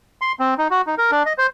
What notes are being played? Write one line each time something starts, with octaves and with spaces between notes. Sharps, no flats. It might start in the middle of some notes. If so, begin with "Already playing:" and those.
C6
C4
D#4
F#4
D#4
A#4
D4
D#5
C5